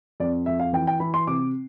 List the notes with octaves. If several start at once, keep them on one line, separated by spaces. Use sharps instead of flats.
F2 D5
F2 E5
F5
E3 G5
G5
E3 B5
C6
C3 D6